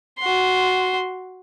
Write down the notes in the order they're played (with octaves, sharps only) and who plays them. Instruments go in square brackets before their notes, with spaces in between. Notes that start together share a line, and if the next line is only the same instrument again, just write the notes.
[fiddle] F#4 C6